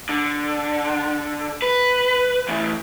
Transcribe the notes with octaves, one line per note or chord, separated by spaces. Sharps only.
D3
B4
A2 E3